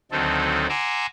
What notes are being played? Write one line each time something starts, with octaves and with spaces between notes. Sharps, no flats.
D2 D#3 F#3 C4 D#4 A4
F#5 G#5 A#5 C6 D6 E6